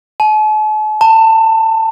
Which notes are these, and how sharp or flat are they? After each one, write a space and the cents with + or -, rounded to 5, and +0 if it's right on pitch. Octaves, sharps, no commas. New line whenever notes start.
A5 -45
A5 +25